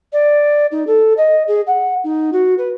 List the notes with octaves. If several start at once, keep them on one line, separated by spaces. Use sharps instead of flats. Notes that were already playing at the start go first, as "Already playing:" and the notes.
D5
D#4
A4
D#5
G#4
F#5
D#4
F#4
B4